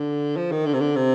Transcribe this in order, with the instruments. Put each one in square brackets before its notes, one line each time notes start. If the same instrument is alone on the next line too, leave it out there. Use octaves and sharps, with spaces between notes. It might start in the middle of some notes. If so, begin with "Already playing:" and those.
Already playing: [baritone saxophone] D3
F3
D#3
D3
C3
D3
C3